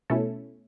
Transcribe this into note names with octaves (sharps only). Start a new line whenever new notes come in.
B2 A3 C#4 E4 A4